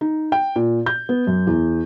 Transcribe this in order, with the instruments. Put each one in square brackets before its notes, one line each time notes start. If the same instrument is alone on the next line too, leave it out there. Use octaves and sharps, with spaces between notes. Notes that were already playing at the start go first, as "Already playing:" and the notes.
[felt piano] D#4
G5
A#2
G6
B3
F#2
E2